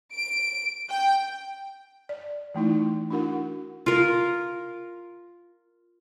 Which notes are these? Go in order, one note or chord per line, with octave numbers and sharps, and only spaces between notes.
D7
G5
D5
E3 A3 D#4 E4
D4 E4 F#4 A#4 F#5
F4 A#4